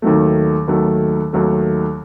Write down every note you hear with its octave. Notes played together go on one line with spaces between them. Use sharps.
D#2 D#3 F#3 A3
D#2 D#3 F#3 A3
D#2 D#3 F#3 A3